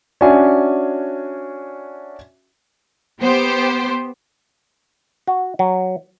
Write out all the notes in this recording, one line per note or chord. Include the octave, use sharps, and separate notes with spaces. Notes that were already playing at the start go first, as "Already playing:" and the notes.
C#4 D4 F#4 E5 G#5
B3 G4 C5
F#4
F#3